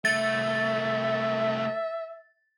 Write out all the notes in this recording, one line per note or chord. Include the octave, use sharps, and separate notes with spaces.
C2 A3 E5 A6